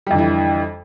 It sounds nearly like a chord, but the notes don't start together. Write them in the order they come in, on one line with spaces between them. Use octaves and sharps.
G3 F2 D3 E3